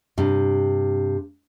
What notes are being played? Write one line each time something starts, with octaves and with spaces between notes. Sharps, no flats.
G2 C3